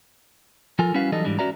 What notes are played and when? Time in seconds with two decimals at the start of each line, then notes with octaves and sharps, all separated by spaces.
0.79 F3 F4 A4 A#4 G#5
0.94 G3 C#4 E4 F#4 B4 F5
1.12 E3 F#3 G3 D#4 A4 D#5
1.25 G#2 E3 G3 D4
1.39 C#4 F#4 B4 D5 E5 A#5